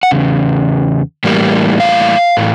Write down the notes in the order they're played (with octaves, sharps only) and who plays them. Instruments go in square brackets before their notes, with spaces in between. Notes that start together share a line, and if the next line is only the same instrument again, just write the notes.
[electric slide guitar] F#5
E2 C#3
A2 E3 G3 A#3
F5
A2 E3